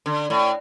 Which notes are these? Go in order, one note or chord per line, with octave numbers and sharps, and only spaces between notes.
D3
A2